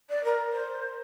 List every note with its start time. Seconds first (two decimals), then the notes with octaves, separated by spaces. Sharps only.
0.09 D5
0.23 A#4
0.52 C5